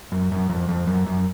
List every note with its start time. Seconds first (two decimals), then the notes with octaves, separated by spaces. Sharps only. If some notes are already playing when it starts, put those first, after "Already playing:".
0.12 F#2
0.32 F#2
0.49 F2
0.68 F2
0.87 F#2
1.06 F#2